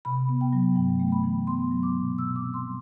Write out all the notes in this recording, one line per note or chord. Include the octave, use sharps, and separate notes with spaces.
C3 B5
B3
G5
F#3
G2 G5
A3
B5
E3
B3 C6
F#3
D6
B2
B2 E6
D6
C4
C6
G3